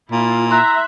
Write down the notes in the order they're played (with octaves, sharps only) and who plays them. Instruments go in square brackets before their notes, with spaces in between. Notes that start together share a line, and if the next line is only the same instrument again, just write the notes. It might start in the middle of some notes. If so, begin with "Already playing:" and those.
[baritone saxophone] A#2 [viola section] E4 F4
[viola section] E5 [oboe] A#5 [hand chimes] C6 F6 F#6